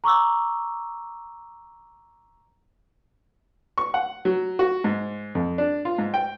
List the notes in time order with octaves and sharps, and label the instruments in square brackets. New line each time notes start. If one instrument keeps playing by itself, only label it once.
[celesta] A#5 C#6 D6 E6
[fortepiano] C#6
F#5
F#3
F#4
G#2
F2
D4
F4
G#2
G5